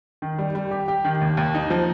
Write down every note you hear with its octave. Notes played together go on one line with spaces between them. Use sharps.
D#3
G3
G3
G4
G4
D#3
D#2
D#2
D#4
F3